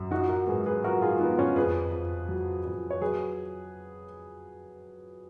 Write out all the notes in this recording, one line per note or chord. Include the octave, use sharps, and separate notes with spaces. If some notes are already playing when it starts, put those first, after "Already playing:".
Already playing: F#2
F3 D#4 F#4
F#4 A#4
G#2 G#4 B4
G#4 B4
F3 F#4 A#4
F4 G#4
F3 B3 D#4
C#4 F4
F2 G#4 B4
F2
F#3
F2
C#5
F#3 G#4 B4